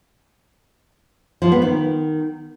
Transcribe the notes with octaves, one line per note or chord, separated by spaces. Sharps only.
F3
B3
D#3